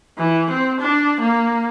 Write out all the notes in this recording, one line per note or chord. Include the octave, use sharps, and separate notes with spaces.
E3
C4
D4
A#3